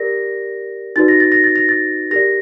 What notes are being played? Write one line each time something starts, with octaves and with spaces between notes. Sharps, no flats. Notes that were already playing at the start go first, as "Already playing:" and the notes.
Already playing: G4 A#4 D5 A#6
D#4 F#4 B4 D5 A6
A#6
A6
A#6
A6
A#6
A6
G4 A#4 D5 A#6